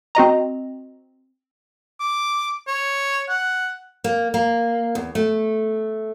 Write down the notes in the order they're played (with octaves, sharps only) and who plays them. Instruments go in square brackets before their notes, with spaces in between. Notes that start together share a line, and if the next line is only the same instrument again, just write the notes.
[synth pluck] C4 F#4 D#5 A#5
[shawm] D6
C#5
F#5
[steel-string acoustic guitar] A#3
A#3
E2
A3